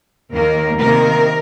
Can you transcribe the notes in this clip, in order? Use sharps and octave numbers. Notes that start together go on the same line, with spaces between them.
D#2 D#3 A#3 A#4
C3 D#3 A#3 A#4